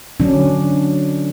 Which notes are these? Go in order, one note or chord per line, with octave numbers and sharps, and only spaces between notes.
D3 F#3 C#4 D4